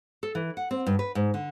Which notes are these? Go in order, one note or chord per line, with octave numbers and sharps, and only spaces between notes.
A4
E3
F#5
C4
G2
B4
G#2
D3